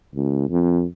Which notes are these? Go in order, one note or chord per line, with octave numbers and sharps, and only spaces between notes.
C#2
F2